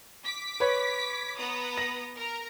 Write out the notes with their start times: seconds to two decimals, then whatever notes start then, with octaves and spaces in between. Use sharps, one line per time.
0.23 D6 B6
0.60 B4 C#5
1.38 B3 A#5 D#6
1.78 A#6
2.16 A#4 A#5